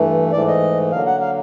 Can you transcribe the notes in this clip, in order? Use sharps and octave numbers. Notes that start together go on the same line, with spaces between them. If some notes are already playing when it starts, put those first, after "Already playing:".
Already playing: G2 E3 A3
G#2 E3 A3 D5
D#5
D3 F#3 A#3 F5
F#5
F5